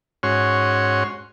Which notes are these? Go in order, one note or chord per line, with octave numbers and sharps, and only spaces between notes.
G#2 C#4 F#4 C#5 C6